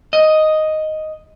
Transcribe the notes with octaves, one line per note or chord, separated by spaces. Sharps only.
D#5